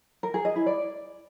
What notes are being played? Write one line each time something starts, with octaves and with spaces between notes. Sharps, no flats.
A#4
G#4
D#5
E4
D5